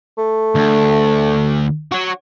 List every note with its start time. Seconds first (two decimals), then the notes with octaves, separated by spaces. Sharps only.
0.18 A3
0.55 D2
1.92 F#4 C#5